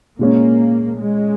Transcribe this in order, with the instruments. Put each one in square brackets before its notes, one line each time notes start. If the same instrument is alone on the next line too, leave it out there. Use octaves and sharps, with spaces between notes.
[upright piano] A#2 G#3 C#4 [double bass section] A#3
[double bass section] G#3